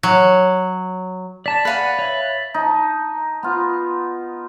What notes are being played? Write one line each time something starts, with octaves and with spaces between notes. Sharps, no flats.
F#3
D5 A5 A6 B6
B4 D5 F5 F#5 G#5 B5
C#5 E5 F#7
D#4 A5
B3 F4